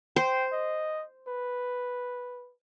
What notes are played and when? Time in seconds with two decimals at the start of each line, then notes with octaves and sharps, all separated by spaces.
0.16 C5 G5
0.53 D#5
1.28 B4